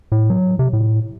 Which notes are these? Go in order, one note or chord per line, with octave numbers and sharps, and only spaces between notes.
A2
F#3
C3
A2